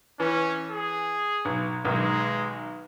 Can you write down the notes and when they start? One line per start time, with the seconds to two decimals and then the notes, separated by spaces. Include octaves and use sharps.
0.20 E3 C#4
0.71 G#4
1.45 B1
1.85 B1 D#3 G#3